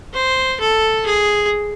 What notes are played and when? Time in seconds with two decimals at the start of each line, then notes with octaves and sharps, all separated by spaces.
0.14 C5
0.60 A4
1.06 G#4